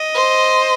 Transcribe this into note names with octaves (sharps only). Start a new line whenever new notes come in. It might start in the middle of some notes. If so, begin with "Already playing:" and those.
Already playing: D#5
C5